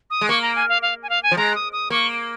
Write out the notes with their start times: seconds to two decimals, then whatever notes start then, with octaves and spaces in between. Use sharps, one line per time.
0.10 D#6
0.21 G#3
0.29 A#3 C#6
0.42 A#5
0.56 G#5
0.69 F5
0.82 F5
1.03 G#5
1.09 F5
1.23 G#5
1.31 F3
1.37 G#3 A#5
1.55 D#6
1.73 D#6
1.90 A#3 C#6